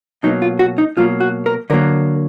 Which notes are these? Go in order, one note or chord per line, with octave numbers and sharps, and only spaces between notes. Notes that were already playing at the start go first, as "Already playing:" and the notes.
B2 F#3 A#3 D#4
F4
F#4
D#4
B2 F#3 A#3 F4
F#4
A#4
D3 F#3 A#3 A#4